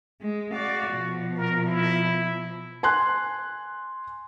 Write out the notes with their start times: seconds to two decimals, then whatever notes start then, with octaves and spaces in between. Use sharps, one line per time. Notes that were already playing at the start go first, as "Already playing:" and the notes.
0.21 G#3
0.51 F#4 D5 F5
0.92 B2 F3
1.37 A#4
1.67 E4
2.83 G#5 C6 F#6